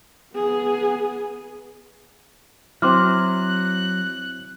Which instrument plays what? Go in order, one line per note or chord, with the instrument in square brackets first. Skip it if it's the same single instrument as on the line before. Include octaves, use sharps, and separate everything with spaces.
[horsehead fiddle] B3 G#4
[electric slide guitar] F#3 [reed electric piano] C4 E4 [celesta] C6 D6 F6 [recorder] F#6